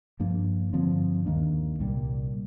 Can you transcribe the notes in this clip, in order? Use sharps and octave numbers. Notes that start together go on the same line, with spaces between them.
G2 F3 A#3 D4
G2 D3 F3 C4
D#2 D#3 A#3 D4
C2 A#2 G3 A#3